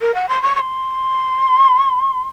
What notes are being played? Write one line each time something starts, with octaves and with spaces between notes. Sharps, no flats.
A#4
F#5
C6
C#6
C#6
C6